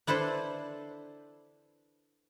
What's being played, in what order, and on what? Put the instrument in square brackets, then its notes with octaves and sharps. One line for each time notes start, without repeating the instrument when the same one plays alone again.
[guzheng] D4 E4 A4 B4 C5